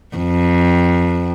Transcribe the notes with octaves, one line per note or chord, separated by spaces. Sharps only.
F2